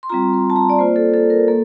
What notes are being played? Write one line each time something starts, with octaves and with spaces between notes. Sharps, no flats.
C6
G3 C4 F4 A#5
C6
A5
A#5
D5
A#3 F4 C5
A4
A4
A#4
A#3 A4